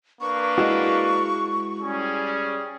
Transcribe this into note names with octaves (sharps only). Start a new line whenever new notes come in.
A#3 D4 B4 C#6
G#3 E4 F#4
G3 C#4 G#4